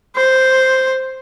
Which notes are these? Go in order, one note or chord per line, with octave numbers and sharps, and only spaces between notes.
C5